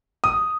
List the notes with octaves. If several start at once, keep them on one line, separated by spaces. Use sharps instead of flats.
D#6